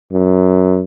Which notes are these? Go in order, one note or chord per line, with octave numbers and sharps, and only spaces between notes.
F#2